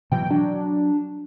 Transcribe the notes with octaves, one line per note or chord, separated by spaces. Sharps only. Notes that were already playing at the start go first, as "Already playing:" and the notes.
B2 E3 F#3 G5
F#3 D4